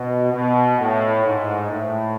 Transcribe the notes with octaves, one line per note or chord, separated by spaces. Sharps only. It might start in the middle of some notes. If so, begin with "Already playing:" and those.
Already playing: B2
B2
A2
G#2
A2